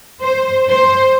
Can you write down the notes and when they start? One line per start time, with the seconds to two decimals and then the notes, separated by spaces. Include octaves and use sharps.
0.23 C5
0.67 C5